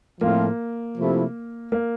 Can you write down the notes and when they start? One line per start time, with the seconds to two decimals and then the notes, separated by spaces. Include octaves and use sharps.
0.21 A2 F3 A3 A#3 C4 F4
0.97 C3 F3 A3 E4
1.72 A#3